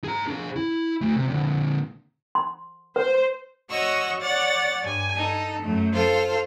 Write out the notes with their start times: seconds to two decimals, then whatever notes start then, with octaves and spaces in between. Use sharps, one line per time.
0.04 G#4 A#5
0.27 D4 G#4
0.56 E4
1.01 A3 F#4
1.16 C3
1.28 A#2 D3
2.35 C6
2.96 B4 C5
3.70 F#4 C#5 D#5 F#5 C#6 E6
4.20 C#5 D5 F#5 A6
4.82 G2 G#5
5.15 D#4 A4
5.62 F#2 A3
5.94 F4 A4 C5 F5